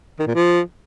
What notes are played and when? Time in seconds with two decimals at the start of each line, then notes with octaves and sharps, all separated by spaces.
0.19 D#3
0.27 A#2
0.35 F3